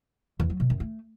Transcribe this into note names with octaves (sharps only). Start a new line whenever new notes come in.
E2
F#3
B2
F#2
A3